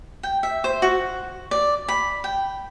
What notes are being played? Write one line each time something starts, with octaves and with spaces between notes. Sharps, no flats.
G5
E5
C5
F#4
D5
B5
G5